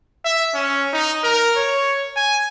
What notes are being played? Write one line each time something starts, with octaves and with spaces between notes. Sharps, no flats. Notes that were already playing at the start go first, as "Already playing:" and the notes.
E5
C#4
D#4
A#4
C#5
G#5